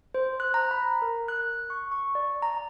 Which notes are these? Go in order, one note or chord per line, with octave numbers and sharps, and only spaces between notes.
C5
F#6
A#5
B5
A#4
F#6
C#6
C#6
D5
A#5